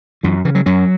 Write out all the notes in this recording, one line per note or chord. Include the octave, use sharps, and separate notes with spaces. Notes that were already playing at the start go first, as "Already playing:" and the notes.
F#2 E3
C#3 E3
F#3
F#2 F#3